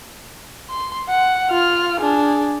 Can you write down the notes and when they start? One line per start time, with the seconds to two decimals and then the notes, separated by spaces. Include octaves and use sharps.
0.70 C6
1.09 F#5
1.50 F4 F6
2.00 D4 G#4